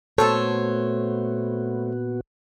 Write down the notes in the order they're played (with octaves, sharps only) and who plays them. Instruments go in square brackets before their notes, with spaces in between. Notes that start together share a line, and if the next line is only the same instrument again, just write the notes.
[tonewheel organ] A#2 B3 F#4 [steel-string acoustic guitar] A3 C5 C#5 [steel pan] A4